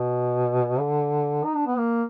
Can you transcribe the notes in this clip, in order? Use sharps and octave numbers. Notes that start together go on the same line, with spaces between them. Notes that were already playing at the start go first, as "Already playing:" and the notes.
Already playing: B2
D3
D#4
D4
B3
A#3